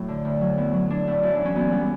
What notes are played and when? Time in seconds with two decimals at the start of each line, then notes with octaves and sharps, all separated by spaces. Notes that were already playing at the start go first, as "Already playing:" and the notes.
Already playing: A2 F#3 E4
0.08 D3
0.25 D2
0.41 F#3
0.57 A2 B3
0.74 F#3
0.90 F#3 D4
1.07 A2 E4
1.23 F#2 E4
1.35 D4
1.40 E3
1.45 C#4
1.56 F#2 B3
1.72 G3 B3